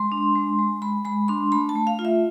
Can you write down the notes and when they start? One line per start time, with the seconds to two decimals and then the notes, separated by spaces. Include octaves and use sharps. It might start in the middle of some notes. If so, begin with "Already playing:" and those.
Already playing: G#3 C6
0.12 D4
0.35 G#3
0.59 G#3
0.82 G#3 B5
1.05 G#3 B5
1.28 D4 C6
1.52 A3 B5
1.69 A5
1.75 A3
1.87 F5
1.99 F4
2.05 E5